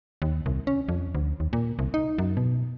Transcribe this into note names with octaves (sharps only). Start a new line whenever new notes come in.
D#2
C2
C#4
F2
D2
D#2
A#2
C2
D#4
F#2
B2